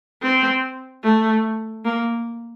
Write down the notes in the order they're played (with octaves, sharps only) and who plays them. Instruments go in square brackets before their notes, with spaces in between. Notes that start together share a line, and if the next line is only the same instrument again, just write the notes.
[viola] C4
A3
A#3